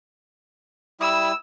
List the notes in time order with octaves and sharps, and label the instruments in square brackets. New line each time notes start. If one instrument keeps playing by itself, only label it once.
[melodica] G3 E4 D#6 [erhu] E6